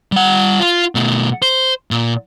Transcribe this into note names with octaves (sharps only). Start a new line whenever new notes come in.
G3 F#5
F4
B2 A3
C5
A#2